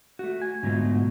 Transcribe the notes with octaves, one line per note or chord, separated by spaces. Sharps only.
A3 F#4
G#5
G#2 B2 D3 F#3 A3 F4